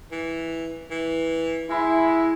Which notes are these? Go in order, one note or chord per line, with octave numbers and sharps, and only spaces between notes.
E3
E3
G#3 E4